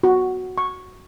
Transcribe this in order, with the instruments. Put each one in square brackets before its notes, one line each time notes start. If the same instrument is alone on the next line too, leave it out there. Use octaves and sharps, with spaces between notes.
[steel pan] F#4
C#6